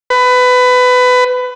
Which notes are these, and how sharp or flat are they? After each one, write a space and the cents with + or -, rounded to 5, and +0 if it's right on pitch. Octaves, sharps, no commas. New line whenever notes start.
B4 +20